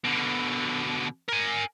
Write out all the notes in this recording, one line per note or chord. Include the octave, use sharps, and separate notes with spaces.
B2 D3
A#4 G#5